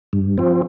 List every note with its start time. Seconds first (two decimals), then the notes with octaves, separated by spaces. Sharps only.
0.13 G2
0.38 F3 C4